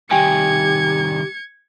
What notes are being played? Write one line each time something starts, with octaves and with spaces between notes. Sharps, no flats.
C2 D#3 G4 G5 G#5 G#6 C#7